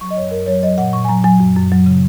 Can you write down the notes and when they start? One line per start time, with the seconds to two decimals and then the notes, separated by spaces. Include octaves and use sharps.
0.01 F#3 C#6
0.11 D#5
0.17 F#2 C#5
0.31 F#2 A#4
0.47 F#3 C#5
0.63 F#3 D#5
0.78 A#2 F#5
0.93 A#2 C#6
1.05 G#5
1.09 F#3 A#5
1.24 F#3 G#5
1.40 F#2
1.56 F#2
1.72 F#3
1.86 C#3